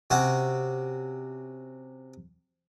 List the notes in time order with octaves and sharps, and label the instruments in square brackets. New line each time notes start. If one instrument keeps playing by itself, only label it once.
[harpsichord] C3 C#4 F#4